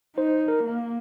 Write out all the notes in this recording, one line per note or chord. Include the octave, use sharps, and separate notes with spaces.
D#4 C5
A#4
A#3